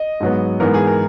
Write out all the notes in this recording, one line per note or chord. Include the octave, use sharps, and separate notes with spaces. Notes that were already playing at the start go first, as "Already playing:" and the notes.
Already playing: D#5
G#2 F#3 B3
G#2 E3 B3 A#4
G#4
A#4